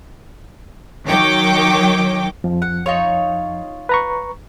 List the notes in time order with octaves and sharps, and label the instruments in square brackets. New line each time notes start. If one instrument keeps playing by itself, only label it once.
[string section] D#3 F#3 C#5 G5 D6
[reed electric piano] F2 F3
[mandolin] F#5
D#4 F4 C#5
[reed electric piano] B4 A#5 C#6